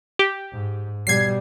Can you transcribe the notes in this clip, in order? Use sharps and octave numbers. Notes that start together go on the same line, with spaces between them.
G4
G#2
B2 G3 G#6 C7